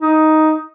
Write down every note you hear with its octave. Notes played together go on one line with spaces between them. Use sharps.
D#4